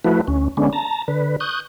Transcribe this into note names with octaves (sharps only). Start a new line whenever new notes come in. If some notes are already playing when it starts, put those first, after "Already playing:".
F3 A3 E4 F#4 B4
D2 C#4
D3 G#3 B3 C#4 D4
A5 A#5
D3 B4
C#6 D#6 F#6 G6